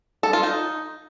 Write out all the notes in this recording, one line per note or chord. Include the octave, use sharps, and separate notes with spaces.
A4
F4
D#4